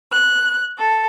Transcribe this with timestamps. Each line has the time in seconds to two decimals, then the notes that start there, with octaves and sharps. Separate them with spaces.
0.12 F#6
0.78 A4